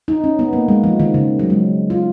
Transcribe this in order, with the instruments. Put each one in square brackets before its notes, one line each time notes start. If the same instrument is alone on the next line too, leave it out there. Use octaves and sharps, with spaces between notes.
[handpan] D#4
C#4
B3
A#3
G#3
F3
D#3
C#3
F#3
G#3
F4